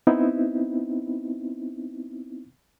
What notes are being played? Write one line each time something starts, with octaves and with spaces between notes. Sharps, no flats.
B3 C4 D#4 E4